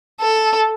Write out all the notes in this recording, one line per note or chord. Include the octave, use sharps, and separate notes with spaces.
A4